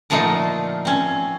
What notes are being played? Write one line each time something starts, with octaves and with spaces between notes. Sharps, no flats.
A#2 D3 F3 A3 D#4 F4
C4 C#4